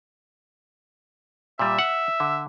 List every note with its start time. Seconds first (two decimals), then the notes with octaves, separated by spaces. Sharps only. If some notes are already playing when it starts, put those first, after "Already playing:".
1.59 A#2 G3 E5
1.79 F#5
2.20 D3